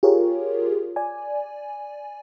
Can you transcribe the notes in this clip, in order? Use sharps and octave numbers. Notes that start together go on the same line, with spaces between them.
F4 G4 G#4 A#4 C#5
D5 G#5